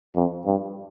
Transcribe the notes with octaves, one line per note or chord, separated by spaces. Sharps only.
F2
G2